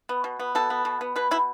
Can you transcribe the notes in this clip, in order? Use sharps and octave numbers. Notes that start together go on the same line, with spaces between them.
B3
B2
B3
B2 A4
B3
B2
B3
B2 B4
B2 E4